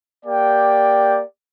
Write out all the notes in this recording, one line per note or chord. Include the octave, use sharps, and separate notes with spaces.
A#3 G4 D5 G5